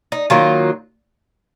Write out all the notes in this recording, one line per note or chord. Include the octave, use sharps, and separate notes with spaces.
D#4
D#3 F#3 A#3 F4